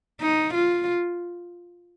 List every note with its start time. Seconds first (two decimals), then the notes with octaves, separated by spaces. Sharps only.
0.21 D#4
0.54 F4